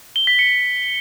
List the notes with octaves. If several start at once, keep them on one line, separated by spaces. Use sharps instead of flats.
G7
B6
C#7